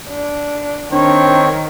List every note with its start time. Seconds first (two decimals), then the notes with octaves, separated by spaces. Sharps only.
0.10 D4
0.92 D#3 C4 D4 C#5